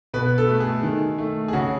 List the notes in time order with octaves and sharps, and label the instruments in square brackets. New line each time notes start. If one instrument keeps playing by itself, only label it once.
[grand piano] B2 B4
A4
A3
G#4
D#3
A3
G#4
C#3 F#4